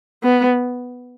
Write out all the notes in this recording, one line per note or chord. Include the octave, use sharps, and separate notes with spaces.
B3